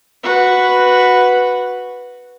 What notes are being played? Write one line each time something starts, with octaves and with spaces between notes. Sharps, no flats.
F#4 B4